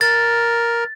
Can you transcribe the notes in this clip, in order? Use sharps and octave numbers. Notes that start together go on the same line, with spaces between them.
A#4 A6